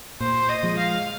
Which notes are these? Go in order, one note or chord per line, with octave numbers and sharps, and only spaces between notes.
A#2 C5
D#5
F3 G#3
F5